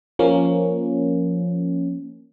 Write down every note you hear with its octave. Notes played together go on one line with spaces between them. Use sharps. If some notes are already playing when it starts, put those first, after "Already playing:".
F3 A#3 C#4